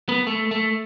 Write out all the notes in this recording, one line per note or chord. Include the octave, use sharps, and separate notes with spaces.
B3
A3
A3